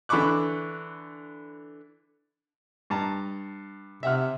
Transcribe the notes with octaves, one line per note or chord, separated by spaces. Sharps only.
D3 E3 B5 C#6 D6 F#6
G2 A5 A#5
C3 E5 F#5 F6